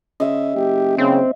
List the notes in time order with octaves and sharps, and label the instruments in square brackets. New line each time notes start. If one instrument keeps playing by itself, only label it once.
[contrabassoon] C#3 [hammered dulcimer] D#5 E5
[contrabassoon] F#1 [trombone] G4
[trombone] C#3 [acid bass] C4